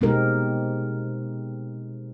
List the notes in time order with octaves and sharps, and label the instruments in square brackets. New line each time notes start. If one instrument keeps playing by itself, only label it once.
[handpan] B2 G#3 C4 D#4 G4 A#4